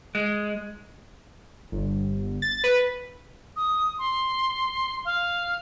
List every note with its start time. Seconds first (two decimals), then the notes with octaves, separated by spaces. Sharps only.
0.15 G#3
1.72 G1
2.42 A6
2.64 B4
3.56 D#6
3.99 C6
5.05 F5